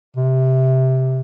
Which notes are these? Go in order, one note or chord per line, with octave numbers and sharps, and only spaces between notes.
C3